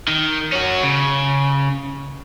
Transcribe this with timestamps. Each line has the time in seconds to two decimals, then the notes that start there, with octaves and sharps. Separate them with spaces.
0.08 D#3
0.52 C#4 F#4
0.83 C#3